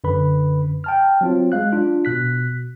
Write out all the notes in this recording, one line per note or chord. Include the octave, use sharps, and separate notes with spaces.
F#2 D3 B4 B5
G5 A5 F6
F#3 C4 F4
G#3 F5 F#6
D4 F4
B2 F#6 B6